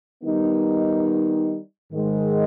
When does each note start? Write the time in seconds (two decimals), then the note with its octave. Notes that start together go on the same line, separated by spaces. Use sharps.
0.23 D#3 G3 B3 D#4
1.93 G#2 D#3 G#3